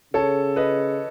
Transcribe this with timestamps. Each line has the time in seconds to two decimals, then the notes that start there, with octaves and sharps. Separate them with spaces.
0.13 C#3 A4 C#5
0.56 B4 D#5